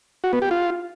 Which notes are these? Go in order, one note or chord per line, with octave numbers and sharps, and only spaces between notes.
F#4
B3
G4
F4